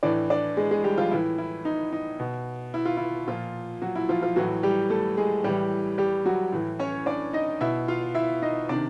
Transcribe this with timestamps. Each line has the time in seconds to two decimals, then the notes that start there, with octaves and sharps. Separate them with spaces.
0.03 A2 E3 D4 D5
0.30 D4 D5
0.57 G#3 G#4
0.71 G#3 G#4
0.84 G3 G4
0.98 F3 F4
1.11 A2 E3 E4
1.38 E4
1.65 D#4
1.93 D#4
2.20 B2
2.74 E4
2.85 F4
2.97 E4
3.28 A#2 F3 F4
3.82 F#3 F#4
3.95 E4
4.09 F3 F4
4.22 F3 F4
4.36 A2 E3 F#3 F#4
4.63 G3 G4
4.90 A3 A4
5.17 G#3 G#4
5.44 A2 E3 G3 G4
5.98 G3 G4
6.25 F#3 F#4
6.53 A2 E3
6.79 C#4 C#5
7.06 D4 D5
7.33 D#4 D#5
7.61 B2 E4 E5
7.88 F4 F5
8.14 E4 E5
8.42 D#4 D#5
8.69 C3 D#3 D4 D5